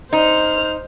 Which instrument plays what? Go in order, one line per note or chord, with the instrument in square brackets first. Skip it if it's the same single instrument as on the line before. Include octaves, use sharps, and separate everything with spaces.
[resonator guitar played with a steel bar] D#4 [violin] C5 F6